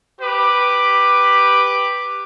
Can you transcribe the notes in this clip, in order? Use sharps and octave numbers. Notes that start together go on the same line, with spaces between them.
G4 B4 D6